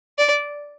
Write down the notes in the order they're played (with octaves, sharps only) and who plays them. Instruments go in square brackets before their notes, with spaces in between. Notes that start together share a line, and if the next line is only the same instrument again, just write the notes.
[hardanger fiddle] D5